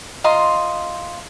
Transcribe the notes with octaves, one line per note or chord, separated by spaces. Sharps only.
F4 D#5 A#5 C6